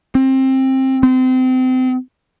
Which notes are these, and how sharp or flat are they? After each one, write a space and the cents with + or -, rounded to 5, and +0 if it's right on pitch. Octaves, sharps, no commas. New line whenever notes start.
C4 +20
C4 -30